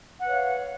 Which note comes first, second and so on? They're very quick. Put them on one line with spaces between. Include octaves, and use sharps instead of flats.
F#5 B4 C#5 F5